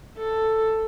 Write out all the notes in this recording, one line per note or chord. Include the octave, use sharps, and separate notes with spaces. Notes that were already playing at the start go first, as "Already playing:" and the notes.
A4